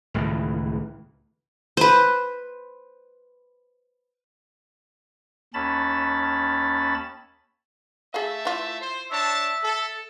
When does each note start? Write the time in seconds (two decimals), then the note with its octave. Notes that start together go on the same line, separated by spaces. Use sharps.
0.14 C#2 A2 D#3 E3
1.77 B4 C5
5.54 D#2 C#4 A5 B5 A6
8.14 A3 G#4 A4 E5 F5 A5
8.45 E3 F4
8.80 C5
9.11 D4 C#5 E5 A5
9.63 A4